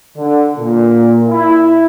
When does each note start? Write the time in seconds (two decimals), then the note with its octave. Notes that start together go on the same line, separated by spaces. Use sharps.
0.16 D3
0.58 A#2
1.28 E4